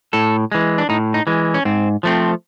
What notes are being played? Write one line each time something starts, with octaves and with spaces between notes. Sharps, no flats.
A2 A4
E3 G#3
D4
A2 D#4
D#4
E3 G#3
C#4
G#2 C4
F3 A3 C4